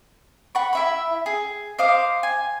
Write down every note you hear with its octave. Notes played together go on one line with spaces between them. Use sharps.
F#5 B5 C#6
E4 E5 B5
G#4
C5 D#5 F5 D6
G#5